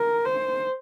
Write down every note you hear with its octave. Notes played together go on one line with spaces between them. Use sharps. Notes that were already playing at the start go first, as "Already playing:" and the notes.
Already playing: A#4
C5